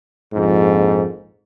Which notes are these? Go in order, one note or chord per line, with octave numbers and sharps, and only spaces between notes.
A#1 F2 G#2